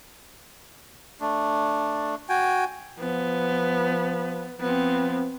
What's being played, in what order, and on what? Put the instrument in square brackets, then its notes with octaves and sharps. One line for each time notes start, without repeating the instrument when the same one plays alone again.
[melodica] A3 D4
F#4 G5 G#5
[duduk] F3 [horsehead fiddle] B3
[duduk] F3 [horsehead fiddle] B3 C4